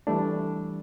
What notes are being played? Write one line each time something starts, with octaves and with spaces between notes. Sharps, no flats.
E3 G3 A3 D4